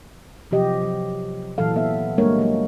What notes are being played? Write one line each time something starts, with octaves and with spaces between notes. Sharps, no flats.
C3 F3 F#3 G4 D#5
F#3
A#2 E3 F#3 A4 F5
B3 A4 E5
G3 G#3 A#3 D4 A#4 C#5
F#3 A#3